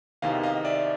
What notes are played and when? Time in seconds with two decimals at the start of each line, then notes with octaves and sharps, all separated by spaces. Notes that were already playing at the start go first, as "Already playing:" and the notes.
0.22 E2 C3 D#3 D#5 F5
0.43 D#5 F5
0.65 D5 E5